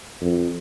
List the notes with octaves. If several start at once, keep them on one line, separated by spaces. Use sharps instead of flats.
F2